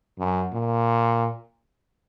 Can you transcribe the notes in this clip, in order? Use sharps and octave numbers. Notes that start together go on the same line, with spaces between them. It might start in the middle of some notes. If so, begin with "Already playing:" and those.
F#2
A#2